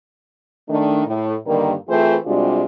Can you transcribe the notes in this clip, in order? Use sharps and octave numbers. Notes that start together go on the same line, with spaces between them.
D#3 A3 D4
A2
G2 D3 D#3 G3 A#3
E3 A3 C4 F4 G#4 C5
C3 G3 G#3 D4 F4 F#4